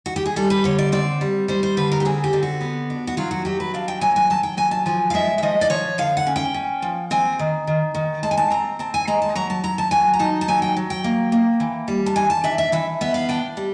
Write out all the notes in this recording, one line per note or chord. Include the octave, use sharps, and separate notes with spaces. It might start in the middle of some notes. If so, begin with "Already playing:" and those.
F#4
G4
G#4
G3 A4
B4
D3 C#5
D5
C4 D5
G3
G3 C5
C5
D3 B4
A#4
G4
C4 G#4
G4
D3
F#4
B3
D4
F#4
F#3 F4
F#4
F#3 G4
B4
D4 F5
G5
F#3 G#5
G#5
F#3 A5
G5
F#3 G#5
A5
F3 G#5
F5
G#3 E5
E5
F3 D#5
D5
F3 C#5
D3 F5
F#5
C#4
G5
C#4
F3
C4 G#5
D#3
D#3
D#3
G#3 A5
G#5
A5
C4 A#5
C4 A5
G#5
G#3 A#5
A5
F#3 A#5
A5
F#3 A#5
A5
F#3 G#5
A#5
D#4 A5
A5
F#3 G#5
G5
F#3
G5
A#3
A#3
E3
G3
A5
E3 G#5
A5
D4 E5
E5
E3 E5
B3 E5
F5
D4 G5
G3